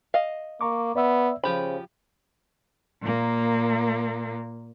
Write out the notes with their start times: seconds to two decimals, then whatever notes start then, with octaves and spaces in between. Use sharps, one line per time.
0.14 D#5 F5
0.61 A#3 A#5 C#6 D6
0.96 B3 D5 E5 E6
1.44 C#3 F3 G4 C5 B5
3.02 A#2 A#3